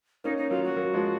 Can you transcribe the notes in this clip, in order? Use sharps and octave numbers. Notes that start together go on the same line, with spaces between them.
A#3 C#4 D#4
D#4
F#3 A#3 F4
F#4
F#3 A#3
F3 G#3